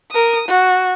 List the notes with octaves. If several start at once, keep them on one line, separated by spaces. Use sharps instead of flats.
A#4 D#6
F#4